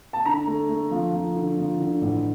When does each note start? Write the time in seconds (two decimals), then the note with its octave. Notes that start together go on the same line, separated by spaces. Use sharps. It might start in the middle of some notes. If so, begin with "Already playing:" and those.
0.13 A5
0.25 D3 A#5
0.47 A3
0.69 A3
0.91 F3
1.13 F3
1.35 D3
1.57 F3
1.79 D3
2.01 A1